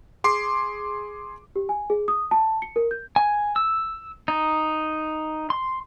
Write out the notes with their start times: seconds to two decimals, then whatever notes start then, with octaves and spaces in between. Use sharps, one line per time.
0.24 G#4 C6 D6 C7
1.56 G4
1.69 G#5
1.90 G#4
2.08 D#6
2.31 A5
2.62 C#7
2.76 A#4
2.91 G6
3.16 G#5
3.56 E6
4.28 D#4
5.50 C6